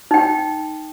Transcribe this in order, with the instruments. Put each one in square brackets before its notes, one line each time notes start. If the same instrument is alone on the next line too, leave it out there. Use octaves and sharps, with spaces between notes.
[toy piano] D#4 G5